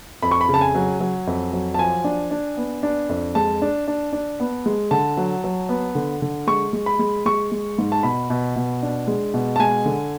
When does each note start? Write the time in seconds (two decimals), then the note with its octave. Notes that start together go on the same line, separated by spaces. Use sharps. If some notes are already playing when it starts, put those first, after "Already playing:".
0.23 F2 B5
0.31 C#6
0.41 B5
0.49 C#3
0.54 A5
0.61 G#5
0.75 F#3
1.00 F#3
1.27 F2
1.53 F#3
1.74 A5
1.79 F3 G#5
2.04 D4
2.31 D4
2.57 B3
2.83 D4
3.09 F2
3.35 G#3 A5
3.62 D4
3.88 D4
4.13 D4
4.40 B3
4.66 G#3
4.91 D3 A5
5.17 F#3
5.44 F#3
5.69 B3
5.95 D3
6.22 D3
6.47 G#3 C#6
6.73 G#3
6.86 B5
6.99 G#3
7.26 G#3 C#6
7.52 G#3
7.78 G#2
7.92 A5
8.03 B2 B5
8.30 B2
8.56 B2
8.82 D4
9.07 G#3
9.34 B2
9.56 A5
9.60 G#3 G#5
9.86 D3